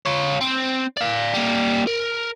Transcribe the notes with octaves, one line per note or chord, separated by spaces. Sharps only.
F4 C#5
C4
D5 F5
G3 A#3
A#4